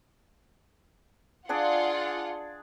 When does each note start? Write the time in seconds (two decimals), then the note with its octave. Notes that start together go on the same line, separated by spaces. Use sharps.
1.49 D4 F4 G#4 D5 F#5